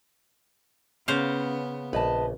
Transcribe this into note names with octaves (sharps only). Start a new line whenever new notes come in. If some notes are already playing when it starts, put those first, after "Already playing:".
C#3 B3 C5 F5
A#1 B4 D#5 A5